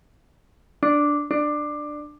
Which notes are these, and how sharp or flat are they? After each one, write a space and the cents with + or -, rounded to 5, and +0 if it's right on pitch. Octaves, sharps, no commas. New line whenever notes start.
D4 +0
D4 +15